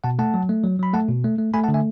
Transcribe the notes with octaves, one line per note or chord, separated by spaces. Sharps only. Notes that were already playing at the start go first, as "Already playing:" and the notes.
B2 F#5 A5
A3 F#5 A5
F#3
A3
F#3
F#3 B5
A3 F#5 A5
B2
A3
A3
A3 G#5 B5
F#5 A5
D3
E5 G#5